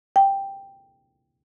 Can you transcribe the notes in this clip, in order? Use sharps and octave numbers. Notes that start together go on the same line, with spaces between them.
G5